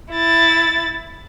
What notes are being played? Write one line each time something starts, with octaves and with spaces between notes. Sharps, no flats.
E4 A6